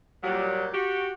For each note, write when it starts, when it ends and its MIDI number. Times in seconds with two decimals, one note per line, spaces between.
0.23 0.68 46
0.23 0.68 54
0.23 0.68 55
0.74 1.11 66
0.74 1.11 67